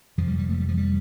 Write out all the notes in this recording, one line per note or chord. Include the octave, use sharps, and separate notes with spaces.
F1 F2 C3 F3
G3
G3
A3
G3
F3
G3